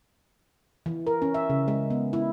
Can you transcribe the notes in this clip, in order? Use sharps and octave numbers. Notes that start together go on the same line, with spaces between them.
E3
A#4
C#4
E5
C#3
G#3
B3
E4